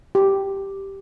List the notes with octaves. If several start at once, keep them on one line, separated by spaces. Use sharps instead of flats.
G4